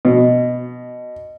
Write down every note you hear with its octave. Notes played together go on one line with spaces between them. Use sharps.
B2